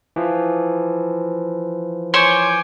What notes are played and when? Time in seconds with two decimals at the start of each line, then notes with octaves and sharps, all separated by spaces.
0.16 E3 F3
2.14 C5 C#5 G#5 C6 D6 G6